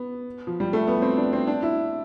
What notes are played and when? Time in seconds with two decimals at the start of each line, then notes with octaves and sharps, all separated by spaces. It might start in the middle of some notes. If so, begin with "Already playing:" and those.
Already playing: B3
0.47 F3
0.60 G3
0.73 A3
0.87 B3
1.02 C4
1.17 D4
1.33 C4
1.47 D4
1.63 E4